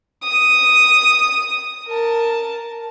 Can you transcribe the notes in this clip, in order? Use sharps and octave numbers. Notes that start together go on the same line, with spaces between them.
D#6
A#4 A5